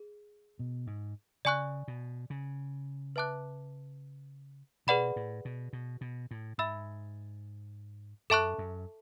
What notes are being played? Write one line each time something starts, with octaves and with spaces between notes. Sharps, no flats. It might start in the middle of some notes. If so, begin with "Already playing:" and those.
Already playing: G#4
B2
G#2
C#3 D5 G#5 C#6 F#6
B2
C#3
B4 E5 A5 D6 F#6
B2 G#4 B4 D5 F#5 B5
A2
B2
B2
B2
A2
G#2 E5 B5 E6
F#2 A4 E5 A5 C#6 F#6
F#2